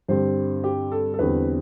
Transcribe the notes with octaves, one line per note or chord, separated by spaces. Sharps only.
G2 D3 G3 C4 C5
G4
A4
A4
E2 D3 G3 C4 B4